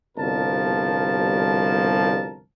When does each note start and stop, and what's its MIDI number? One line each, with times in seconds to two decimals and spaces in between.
0.17 2.41 31
0.17 2.41 36
0.17 2.41 47
0.17 2.41 53
0.17 2.41 70
0.17 2.41 81